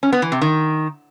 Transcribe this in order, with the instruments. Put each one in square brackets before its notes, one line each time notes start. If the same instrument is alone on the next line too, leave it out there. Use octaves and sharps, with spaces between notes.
[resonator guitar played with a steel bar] C#4
B3
E3
C3
D#3